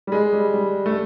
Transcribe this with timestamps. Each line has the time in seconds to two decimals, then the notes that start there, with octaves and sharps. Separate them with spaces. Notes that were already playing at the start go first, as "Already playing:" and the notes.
0.07 G3
0.12 G#3
0.33 G3
0.54 G3
0.86 A3